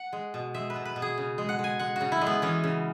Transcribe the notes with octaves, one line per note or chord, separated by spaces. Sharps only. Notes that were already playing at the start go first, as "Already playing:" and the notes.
Already playing: F#5
G#3
B2
G#3 E5
B4
B2
B4
B2
G#4
C#3
G#3
F#5
G#3
G#5
G#3 F#5
C#3 F#4
E4
G#3
B3
E3 C#4
C#3